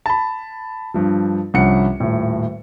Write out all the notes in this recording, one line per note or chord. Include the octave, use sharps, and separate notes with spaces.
A5 B5
G2 F3
C2 G2 F3 C#4 F#5 C#7
D#1 A2